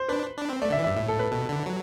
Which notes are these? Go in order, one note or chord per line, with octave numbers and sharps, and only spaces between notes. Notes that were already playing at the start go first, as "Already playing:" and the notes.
Already playing: C5
D4 B4
D4
C4
A3 D5
D3 E5
E3
E5
G2
A2 E5
A4
B4
B2 A4
D3
F#3